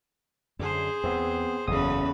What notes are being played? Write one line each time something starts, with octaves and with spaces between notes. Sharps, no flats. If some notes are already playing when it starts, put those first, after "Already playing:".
F#2 D3 G#4 C5
E2 B3 C4
F#1 E2 C#3 A4 B4 D#6